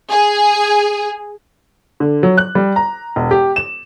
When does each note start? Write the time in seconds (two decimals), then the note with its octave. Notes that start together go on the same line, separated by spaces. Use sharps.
0.10 G#4
2.00 D3
2.23 F#3
2.37 F#6
2.55 G3
2.76 A#5
3.16 E1
3.31 G4
3.56 E7